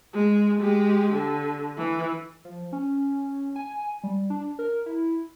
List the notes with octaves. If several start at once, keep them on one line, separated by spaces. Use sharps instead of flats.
G#3
G#3 G4
D3
E3
F3
C#4
G#5
G3
D4
A#4
E4